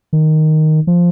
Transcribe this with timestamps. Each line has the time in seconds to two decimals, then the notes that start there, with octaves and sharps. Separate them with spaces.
0.13 D#3
0.87 F3